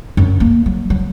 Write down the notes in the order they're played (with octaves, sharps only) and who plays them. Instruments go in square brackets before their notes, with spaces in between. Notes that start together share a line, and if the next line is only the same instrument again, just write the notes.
[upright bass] F#2
A#3
F#3
F#3